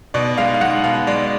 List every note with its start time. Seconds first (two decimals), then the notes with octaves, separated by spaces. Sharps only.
0.14 B2 D5
0.38 G#3 F5
0.54 F5
0.61 G#3 F#5
0.84 B2 F5
1.07 G#3 D5